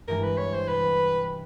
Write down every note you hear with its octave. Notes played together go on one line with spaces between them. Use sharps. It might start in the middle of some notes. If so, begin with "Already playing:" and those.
G2 E3 G#3 A#4
B4
C#5
C5
C3 B4